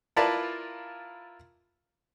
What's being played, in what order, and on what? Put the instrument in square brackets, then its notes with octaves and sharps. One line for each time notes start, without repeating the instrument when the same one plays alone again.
[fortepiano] E4 F4 A#4 B4 D5 A5